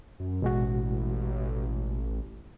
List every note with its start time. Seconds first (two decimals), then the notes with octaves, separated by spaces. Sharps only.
0.20 F#2
0.42 A1 B2 G#3 F#4